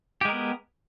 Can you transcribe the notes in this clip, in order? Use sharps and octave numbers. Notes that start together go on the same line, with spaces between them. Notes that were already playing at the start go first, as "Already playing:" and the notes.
G#3 B3 G4 A#4